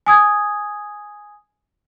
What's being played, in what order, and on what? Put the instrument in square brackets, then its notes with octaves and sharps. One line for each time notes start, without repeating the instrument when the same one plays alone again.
[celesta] G#5 D#6 G#6